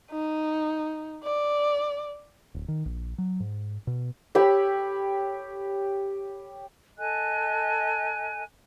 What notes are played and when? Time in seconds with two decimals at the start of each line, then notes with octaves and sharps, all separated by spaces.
0.11 D#4
1.23 D5
2.54 D1
2.68 D#3
2.86 A#1
3.18 F#3
3.40 G#2
3.87 B2
4.35 G4 C#5 B5 E6
6.98 A4 D#5 G#5 F#6